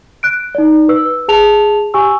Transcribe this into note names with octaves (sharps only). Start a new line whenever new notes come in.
F#6 D7
D#4 D5
B4 E6
G#4 A5 F7
G4 G#5 C#6 E6